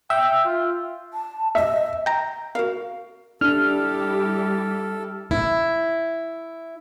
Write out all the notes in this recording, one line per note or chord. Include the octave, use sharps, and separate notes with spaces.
E5 G5
F4
A5
D#5 E5
G5 A#5
F#4 A#4 F5
G3 D4 E4 G4 A4 F6
E4